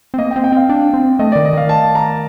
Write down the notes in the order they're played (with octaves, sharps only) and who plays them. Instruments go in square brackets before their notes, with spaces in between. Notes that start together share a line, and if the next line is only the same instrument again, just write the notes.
[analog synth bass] C4
[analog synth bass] A#3 [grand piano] D#5
[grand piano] G5
[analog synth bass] C4
[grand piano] G5
[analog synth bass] C4 [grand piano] F5
[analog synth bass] D4
C4
[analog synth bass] A3 [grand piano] D#5
[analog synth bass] D#3 [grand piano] D5
[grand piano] D#5
[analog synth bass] D#3 [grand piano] F5
[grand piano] A5
A#5